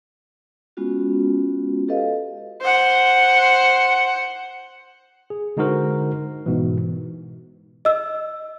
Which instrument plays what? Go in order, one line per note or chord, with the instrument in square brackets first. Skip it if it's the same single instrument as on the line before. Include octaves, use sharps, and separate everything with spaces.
[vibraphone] G#3 B3 C#4 F4 F#4
G4 A4 B4 D#5 F5
[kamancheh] C5 F#5
[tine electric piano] G#4
D3 G#3 D#4 F#4 A#4 C5
G#2 B2 E3
[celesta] D#5 E6